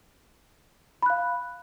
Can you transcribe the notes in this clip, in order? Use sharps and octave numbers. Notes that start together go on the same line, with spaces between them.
F5 B5 F#6